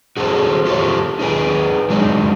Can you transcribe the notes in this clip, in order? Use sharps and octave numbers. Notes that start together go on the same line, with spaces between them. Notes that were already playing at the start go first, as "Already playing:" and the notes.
F#4 G#4 A4 B4 C5
F4 G4 A4 B4 C#5
D#4 G#4 B4 G5 G#5
F#3 G#3 D4 D#4